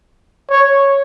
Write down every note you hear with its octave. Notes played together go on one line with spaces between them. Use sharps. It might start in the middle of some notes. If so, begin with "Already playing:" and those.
C#5